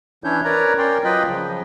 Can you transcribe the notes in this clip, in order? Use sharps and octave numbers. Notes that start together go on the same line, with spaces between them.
E3 C#4 D4 E4 C#5 G6
A#4 B4 C#5 D5 A#5
C#4 A#4 D5 G5 C6
F#3 F4 B4 D#5 G5 B5
C#3 F3